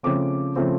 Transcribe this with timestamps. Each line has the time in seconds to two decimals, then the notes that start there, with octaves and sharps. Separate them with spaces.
0.03 C#3 F3 A3 C4 D6
0.56 C#3 F3 A3 C4